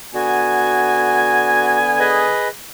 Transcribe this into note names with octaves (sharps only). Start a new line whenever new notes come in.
D3 B3 F#4 G#5
G#4 B4 D#5